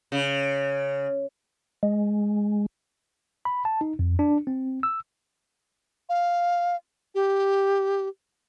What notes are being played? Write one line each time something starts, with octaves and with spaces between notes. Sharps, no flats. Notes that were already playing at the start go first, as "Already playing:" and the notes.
C#3
G#3
B5
A5
D#4
F2
D4
C4
E6
F5
G4